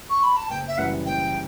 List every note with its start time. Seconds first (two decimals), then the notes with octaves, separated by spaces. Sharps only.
0.10 C#6
0.23 B5
0.37 A5
0.50 F#1 G5
0.68 E5
0.78 F#2 E3 G3 C#4 F#5
1.05 F#1 G5